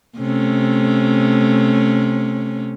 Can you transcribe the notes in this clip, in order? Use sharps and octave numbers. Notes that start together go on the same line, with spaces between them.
C3 A3 C#4